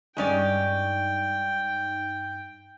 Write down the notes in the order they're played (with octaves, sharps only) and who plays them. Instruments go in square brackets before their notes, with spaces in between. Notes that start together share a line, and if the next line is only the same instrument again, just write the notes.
[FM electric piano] G2 D#4 [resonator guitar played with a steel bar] G#3 C#4 D5 [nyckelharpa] G5